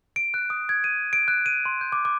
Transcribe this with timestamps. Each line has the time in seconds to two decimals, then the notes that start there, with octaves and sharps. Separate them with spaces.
0.16 D7
0.34 F#6
0.50 D#6
0.69 G#6
0.84 D#7
1.13 D7
1.28 F#6
1.46 D#7
1.65 C6
1.81 G6
1.92 D6
2.05 D6